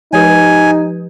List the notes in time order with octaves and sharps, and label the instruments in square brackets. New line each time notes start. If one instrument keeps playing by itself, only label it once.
[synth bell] F3 G4 B4 [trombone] D#4 [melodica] G#5